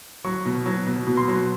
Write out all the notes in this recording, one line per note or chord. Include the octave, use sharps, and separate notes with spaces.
F#3 C#6
B2
F#3
B2
B2
C6
F#3